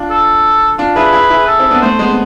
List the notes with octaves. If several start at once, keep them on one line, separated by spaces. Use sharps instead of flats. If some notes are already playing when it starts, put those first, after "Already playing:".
Already playing: D4 F4
A4
D4 F4
E4 G#4 B4
E4 G#4
E4 G#4
A4
C4 E4
B3 D4
A3 C4 C5
G#3 B3
B3